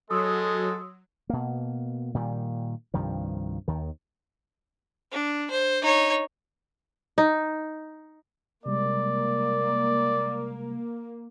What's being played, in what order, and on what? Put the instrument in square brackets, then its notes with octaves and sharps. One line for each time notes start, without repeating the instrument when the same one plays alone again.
[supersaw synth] F#3 [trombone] G#3 [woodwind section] A4 [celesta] C6 D#6 E6
[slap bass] B2 A#3
A#2 D#3 G3
C2 G2 D#3 F3
D#2 D#3
[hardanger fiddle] D4
C5
D#4 C#5
[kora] D#4
[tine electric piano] C3 G3 G#3 [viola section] A#3 [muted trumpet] D5